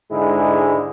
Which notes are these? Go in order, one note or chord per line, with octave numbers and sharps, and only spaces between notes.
G#2 D3 G#3 E4